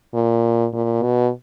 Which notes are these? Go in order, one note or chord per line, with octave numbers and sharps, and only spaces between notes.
A#2
A#2
B2